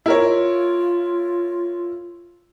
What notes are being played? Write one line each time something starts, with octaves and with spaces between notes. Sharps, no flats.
E4 F4 A#4 C#5